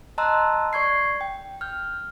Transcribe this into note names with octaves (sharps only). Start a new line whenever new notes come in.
D#5 A5 A#5 C6 E6 F#6
D5 C#6 G#6 C7
G5
F6 G6